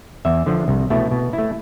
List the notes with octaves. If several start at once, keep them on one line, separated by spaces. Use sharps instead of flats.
E2 E5
D3 F3
C2
B2 A3 E4
B2
E4
A3